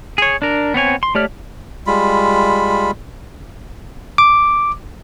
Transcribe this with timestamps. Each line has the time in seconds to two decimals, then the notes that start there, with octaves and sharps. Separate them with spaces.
0.18 G#4 C#5
0.42 D4 A#4
0.74 B3 C4 C#5 G#5
1.03 C6
1.15 A3 G4 C#5 D5 F6
1.87 G3 G#3 F4 B5
4.18 D6